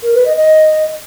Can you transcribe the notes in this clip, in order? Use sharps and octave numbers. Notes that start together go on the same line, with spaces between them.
A#4
B4
D#5
D#5